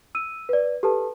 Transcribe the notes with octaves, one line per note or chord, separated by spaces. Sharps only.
E6 D#7
B4 D5
G4 A4 B4 A5